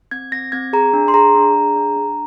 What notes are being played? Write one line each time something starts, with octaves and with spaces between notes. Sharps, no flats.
C4 G#6
C4 A#6
C4 G#6
G#4 A#5
D4
C6
G#4 A#5
D4
G#4
D4
D4